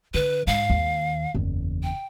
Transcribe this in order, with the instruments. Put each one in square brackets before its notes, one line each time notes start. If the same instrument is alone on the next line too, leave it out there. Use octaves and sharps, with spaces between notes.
[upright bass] D3 [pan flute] B4
[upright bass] G#2 [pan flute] F5
[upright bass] D#2
F#1 E2
[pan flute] G5